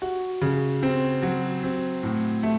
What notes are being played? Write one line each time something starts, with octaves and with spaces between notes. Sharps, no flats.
F#4
C#3
C4
F#3
C4
A2
A3